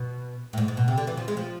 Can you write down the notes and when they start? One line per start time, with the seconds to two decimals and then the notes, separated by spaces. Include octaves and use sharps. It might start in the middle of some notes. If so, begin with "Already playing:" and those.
Already playing: B2
0.53 A2
0.58 G#2
0.68 G#2
0.77 B2
0.88 C3
0.98 D3
1.07 E3
1.17 F3
1.28 G#3
1.37 F3